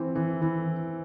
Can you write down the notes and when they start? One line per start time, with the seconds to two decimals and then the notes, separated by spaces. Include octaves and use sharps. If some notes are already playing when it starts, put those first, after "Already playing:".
Already playing: E3 C4
0.15 E3
0.42 E3